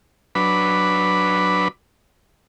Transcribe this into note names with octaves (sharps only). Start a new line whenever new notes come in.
F#3 D4 B4 B5